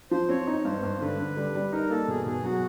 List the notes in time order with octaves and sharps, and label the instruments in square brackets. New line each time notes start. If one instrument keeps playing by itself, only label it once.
[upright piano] F3 [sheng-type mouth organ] C5
[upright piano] C4 [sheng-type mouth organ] C#5
[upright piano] D#4
[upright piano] G2 [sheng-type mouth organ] C5
[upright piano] G2
[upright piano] D3 [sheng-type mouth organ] B4
[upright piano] D3
G3
G3
[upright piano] D#4 [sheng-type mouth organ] A#4
[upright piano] A#3 [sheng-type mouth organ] A4
[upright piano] B2 [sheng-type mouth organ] G#4
[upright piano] B2 [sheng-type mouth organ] G#4
[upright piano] F#3 [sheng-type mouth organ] F#4